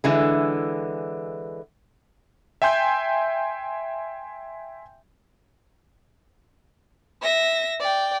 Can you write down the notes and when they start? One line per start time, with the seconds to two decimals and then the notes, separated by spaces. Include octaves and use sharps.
0.04 D3 E3 G#3
2.62 E5 G5 G#5 C6 G6
7.21 E5 A#6
7.80 D5 G5